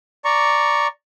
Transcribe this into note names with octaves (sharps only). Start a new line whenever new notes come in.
D5 A#5 C#6